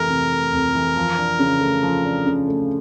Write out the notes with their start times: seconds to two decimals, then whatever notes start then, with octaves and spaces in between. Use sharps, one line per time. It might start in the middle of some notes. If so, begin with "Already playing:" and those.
Already playing: F2 C3 E3 A3 A#4
0.10 C3
0.32 A3
0.53 F2
0.75 E3
0.97 F3
1.18 D4
1.39 C#3
1.61 A3
1.83 F3
2.04 D4
2.26 C#3
2.48 A3